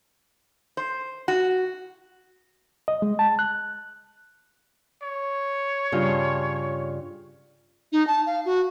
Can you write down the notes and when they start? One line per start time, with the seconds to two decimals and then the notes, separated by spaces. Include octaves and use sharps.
0.77 C5
1.28 F#4
2.88 D#5
3.02 G#3
3.19 A5
3.39 F#6
5.03 C#5
5.92 G2 C#3 F4
7.92 D#4
8.07 A5
8.26 F5
8.45 F#4